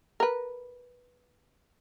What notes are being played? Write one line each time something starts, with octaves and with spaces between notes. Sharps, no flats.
A#4 B4